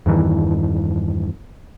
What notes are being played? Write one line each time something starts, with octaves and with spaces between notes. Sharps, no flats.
E2 G2 D#3 E3